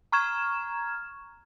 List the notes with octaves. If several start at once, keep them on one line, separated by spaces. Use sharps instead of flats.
A#5 C#6 F6 G#6 E7